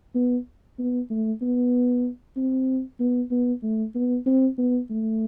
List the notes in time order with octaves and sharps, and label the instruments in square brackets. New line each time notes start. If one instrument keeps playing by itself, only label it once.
[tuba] B3
B3
A3
B3
C4
B3
B3
A3
B3
C4
B3
A3